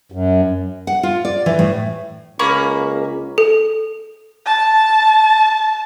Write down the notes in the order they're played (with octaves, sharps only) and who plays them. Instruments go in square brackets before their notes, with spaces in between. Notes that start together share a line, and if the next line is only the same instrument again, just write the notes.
[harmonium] F#2
[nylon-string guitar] F#5
F4
D5
E3
A2
[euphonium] C#2 [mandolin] A#3 C#4 B5
[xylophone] A4
[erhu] A5